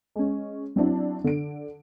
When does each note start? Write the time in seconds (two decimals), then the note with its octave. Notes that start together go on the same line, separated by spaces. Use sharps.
0.16 G#3 C#4
0.76 F#3 C4 D4 E4
1.24 D3 D7